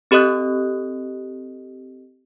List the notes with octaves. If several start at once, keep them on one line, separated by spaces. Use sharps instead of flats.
C4 G4 A4 D#5 D#6 F#6